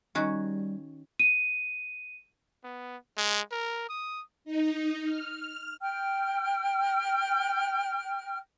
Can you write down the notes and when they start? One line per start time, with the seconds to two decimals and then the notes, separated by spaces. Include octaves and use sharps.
0.15 D#3 G3 C#4 F#4
1.19 D#7
2.64 B3
3.17 G#3
3.52 A#4
3.89 D#6
4.45 D#4
5.05 F6
5.81 G5 F6